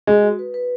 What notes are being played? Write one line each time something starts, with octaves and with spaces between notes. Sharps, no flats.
G#3 F#4
F#4
B4
B4